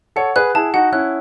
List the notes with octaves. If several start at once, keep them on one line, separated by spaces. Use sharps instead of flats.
A4 C#5 F#5
G#4 B4 F#6
E4 G#4 A5
D#4 F#4 F#5
C#4 E4 F#6